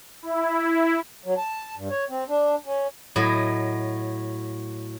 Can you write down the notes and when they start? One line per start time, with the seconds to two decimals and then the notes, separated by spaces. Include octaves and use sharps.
0.22 E4
1.25 F#3
1.37 A5
1.77 G2
1.90 C#5
2.10 C4
2.29 D4
2.66 C#4
3.16 A2 F#3 D#5